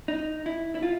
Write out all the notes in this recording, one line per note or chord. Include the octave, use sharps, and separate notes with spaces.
D#4
E4
E4
F4